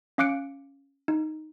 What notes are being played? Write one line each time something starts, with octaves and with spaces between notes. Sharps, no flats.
C#4 F5 D6 F#6 C#7 D7
D#4